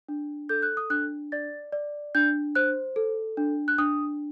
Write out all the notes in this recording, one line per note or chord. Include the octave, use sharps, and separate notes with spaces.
D4
A4 G6
F#6
D#6
D4 F#6
D5 A6
D5
D4 G6
C5 F#6
A4
D4
F#6
D4 D#6